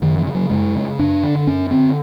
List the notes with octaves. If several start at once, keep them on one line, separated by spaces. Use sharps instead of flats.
F#2 D#3
E3
C#3
F#3
F#2 G#3
C#3
F#2 D4
D3
F#2 C#4
D3 C4